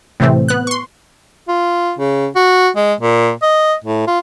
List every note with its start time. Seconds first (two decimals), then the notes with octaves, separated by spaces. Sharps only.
0.20 A2 C3 E3 A3 C4
0.48 B3 F#6
0.67 C6 C#6
1.48 F4
1.99 C#3
2.36 F#4
2.76 G#3
3.01 A#2
3.43 D#5
3.85 A2
4.08 F4